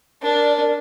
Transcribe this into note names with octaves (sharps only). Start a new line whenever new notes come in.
D4 A#4 D5